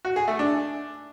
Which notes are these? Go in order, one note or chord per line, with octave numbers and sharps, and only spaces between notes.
F#4
G#4
A3
D4